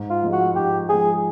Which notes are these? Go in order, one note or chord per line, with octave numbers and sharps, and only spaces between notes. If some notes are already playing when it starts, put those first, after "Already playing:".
Already playing: G#2
F4
F3 G#3
F#4
G#2 G4
F3 G#3 G#4